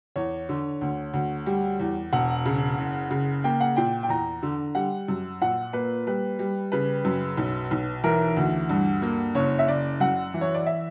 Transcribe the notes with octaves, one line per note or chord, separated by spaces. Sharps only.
E2 C#5
D3
D2
D2
G3
E2
E1 F#5
C#3
F#1
C#3
A#3 G5
F#5
A#2 G5
G5
E2 A#5
D3
G3 F#5
F#2
A#2 F#5
A#3 B4
G3 B4
G3
C#3 B4
F#2
B1
B1
E3 A#4
D2
G2
A#3
F#1 C#5
E5
F#1 D5
F#2 F#5
E3
C#5
D5
E5